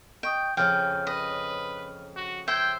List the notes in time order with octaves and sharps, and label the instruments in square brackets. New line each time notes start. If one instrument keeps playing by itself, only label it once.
[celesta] D#5 C#6 D#6 [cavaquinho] G5
[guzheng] F2 C#3 C#4 [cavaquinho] G5 [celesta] F6
[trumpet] B4 [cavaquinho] D#5
[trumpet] F#4
[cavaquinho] C5 E5 [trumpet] G5 [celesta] G#6